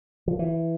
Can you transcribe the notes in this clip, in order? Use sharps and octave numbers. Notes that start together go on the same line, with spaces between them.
F3
E3